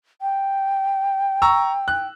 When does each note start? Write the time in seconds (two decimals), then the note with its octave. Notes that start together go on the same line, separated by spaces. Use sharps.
0.22 G5
1.42 A#5 C#6 E6
1.88 F#6